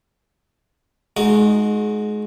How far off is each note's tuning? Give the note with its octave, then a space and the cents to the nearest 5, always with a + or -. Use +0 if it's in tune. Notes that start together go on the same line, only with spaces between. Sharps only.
G#3 +25 D#4 -5 F#4 -20